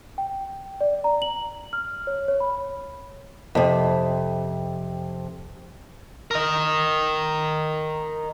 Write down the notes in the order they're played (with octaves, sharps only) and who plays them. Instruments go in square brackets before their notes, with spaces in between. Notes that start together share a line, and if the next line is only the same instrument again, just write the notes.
[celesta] G5
D5
A#5
F#7
F6
C#5
C#5
B5
[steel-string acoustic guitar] F2 C3
[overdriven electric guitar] A#4 D#5